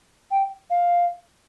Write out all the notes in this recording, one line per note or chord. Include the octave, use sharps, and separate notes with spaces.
G5
F5